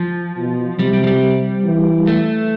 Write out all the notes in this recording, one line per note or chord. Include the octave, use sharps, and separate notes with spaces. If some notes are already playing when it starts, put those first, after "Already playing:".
Already playing: F3
B2
C3 G3
G3
F3
G3
E3
A3